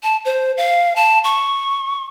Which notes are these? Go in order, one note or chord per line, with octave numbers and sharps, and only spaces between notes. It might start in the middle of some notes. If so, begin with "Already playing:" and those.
A5
C5
F5
A5
C#6